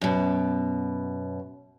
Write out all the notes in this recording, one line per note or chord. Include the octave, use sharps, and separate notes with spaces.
F#2 B2